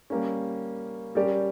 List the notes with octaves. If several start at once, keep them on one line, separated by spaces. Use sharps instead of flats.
G3 A#3 C#4
G3 C#4 G4 A#4 D5